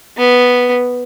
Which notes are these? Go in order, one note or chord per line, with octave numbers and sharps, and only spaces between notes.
B3